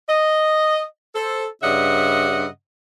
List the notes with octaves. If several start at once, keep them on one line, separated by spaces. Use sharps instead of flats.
D#5
A4 C5
G2 C#3 D#5 E5 F#5